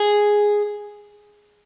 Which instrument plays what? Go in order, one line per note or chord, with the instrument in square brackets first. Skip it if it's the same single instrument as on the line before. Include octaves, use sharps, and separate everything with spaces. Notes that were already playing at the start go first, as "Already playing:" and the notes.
Already playing: [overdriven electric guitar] G#4